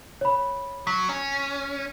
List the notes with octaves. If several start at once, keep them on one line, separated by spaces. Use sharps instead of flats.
C#5 B5
F#3 B6
C#4